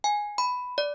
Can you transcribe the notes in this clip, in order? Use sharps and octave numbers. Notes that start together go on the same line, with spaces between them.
G#5
B5
D5